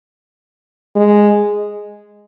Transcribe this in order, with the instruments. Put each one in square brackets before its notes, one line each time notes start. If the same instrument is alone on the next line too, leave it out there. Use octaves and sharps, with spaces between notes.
[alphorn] G#3